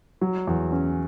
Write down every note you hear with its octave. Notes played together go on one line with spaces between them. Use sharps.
F#3
E2
C#4